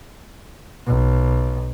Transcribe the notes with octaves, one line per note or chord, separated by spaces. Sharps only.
B1